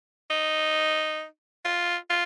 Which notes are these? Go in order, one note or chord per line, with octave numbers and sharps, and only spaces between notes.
D#4
F4
F4